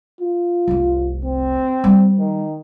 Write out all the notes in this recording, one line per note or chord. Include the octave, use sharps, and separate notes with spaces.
F4
F1 C2
C4
G3
D#3